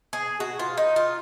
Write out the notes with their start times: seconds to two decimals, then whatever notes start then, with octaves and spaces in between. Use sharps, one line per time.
0.13 G#4
0.40 F#4
0.59 F4
0.77 D#4
0.96 F4